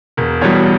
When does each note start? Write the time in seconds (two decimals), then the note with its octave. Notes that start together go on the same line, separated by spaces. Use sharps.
0.17 E1 A#4
0.41 E2 B2 G3 C#5